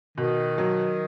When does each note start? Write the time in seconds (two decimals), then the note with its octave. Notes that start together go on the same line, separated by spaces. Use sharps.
0.18 B2 D#3
0.58 F#3